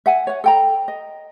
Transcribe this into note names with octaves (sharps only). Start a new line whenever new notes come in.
E5 F#5 G#5
C#5 F#5
A4 G5 A#5
D#5